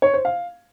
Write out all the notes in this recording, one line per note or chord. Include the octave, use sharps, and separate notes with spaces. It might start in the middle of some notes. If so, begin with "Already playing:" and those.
C#5
C5
F5